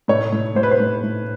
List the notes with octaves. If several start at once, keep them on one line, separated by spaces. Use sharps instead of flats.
A2 C#5
A2
A2 C5
B4
C5
A2
A2